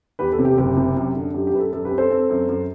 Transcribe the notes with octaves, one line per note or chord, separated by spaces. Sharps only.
E2 G4 B4
A4
C3
G4
F#1 G4
C3
F#2
D3
F#2 G4
G4
F#2 B4
A4
F#2 A4
G4 B4
C4
A4 C5
C4
F#2
F#2